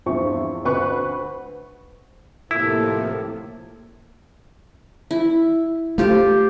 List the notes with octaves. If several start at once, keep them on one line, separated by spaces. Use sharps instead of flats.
E2 G2 F3 C4 E4 C#6
D2 C4 B4 C#6 F#6
A2 C3 F3 A#3 E4 A4
E4
A3 F4 G4 C5